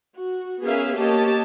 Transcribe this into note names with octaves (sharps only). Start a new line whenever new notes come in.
F#4
B3 C#4 G#4 A#4 E5 F5
A#3 G4 C#5 D#5 A5